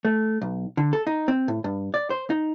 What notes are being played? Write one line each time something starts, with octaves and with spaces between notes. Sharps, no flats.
A3
B1
D3
A4
D#4
C4
A2
G2
D5
C5
D#4